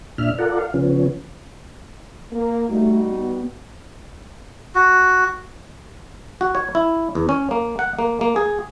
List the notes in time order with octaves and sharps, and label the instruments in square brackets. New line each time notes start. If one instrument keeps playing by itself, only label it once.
[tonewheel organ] A#2 D4 E5 F6
F4 A4 A#4 D5 F#5
F5
C#3 F3 B3 C#4
[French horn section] A#3
[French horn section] G3 D#4 F#4 [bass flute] A3
[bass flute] B3
[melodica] F#4
[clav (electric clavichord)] F#4
C#5
E4
E2
C#4
A#3
F#5
A#3
A#3
G#4